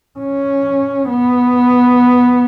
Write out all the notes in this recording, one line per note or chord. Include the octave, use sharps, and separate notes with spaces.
C#4
B3